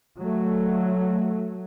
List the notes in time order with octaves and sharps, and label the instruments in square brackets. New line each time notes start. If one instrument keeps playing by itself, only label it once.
[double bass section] F#3 A3